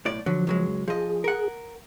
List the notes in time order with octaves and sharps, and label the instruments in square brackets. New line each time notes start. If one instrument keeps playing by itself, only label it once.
[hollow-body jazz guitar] B1 A2 D5
[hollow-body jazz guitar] D3 F#3 [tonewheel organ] F3
[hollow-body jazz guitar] C#2 F#3 G#3
[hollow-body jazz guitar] F3 D#5 [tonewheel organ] G#4
[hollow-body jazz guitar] A#4 F#5